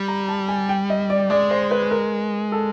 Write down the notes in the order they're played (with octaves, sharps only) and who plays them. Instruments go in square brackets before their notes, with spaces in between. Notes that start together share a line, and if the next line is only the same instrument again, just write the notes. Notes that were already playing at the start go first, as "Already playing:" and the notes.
Already playing: [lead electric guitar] G3
[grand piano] A#5
A5
G#5
G5
D#5
D5
[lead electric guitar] G#3 [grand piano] D5
[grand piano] C5
B4
A#4
A4